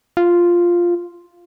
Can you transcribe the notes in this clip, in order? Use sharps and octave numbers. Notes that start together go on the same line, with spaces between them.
F4